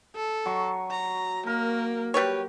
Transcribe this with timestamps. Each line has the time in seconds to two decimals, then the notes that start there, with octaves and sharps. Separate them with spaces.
0.15 A4
0.46 F#3 C#6
0.90 A#5
1.46 A#3 A#4
2.14 G3 G4 B4 C#5